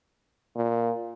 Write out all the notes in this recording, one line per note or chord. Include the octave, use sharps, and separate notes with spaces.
A#2